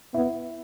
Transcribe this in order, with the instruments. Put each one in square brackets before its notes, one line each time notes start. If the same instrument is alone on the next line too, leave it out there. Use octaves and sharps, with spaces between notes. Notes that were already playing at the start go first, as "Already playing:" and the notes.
[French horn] B3 [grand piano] E4